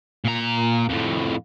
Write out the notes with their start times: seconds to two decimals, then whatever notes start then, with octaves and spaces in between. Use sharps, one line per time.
0.25 A#2 A#5
0.89 F2 A2